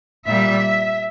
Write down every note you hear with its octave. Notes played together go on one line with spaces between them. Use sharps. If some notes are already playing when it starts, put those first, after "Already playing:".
A#2 G3 E5